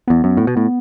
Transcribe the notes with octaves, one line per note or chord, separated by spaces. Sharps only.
E2 B3
F#2
A2
B2
A2